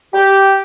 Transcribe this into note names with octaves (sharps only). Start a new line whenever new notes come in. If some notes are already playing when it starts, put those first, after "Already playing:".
G4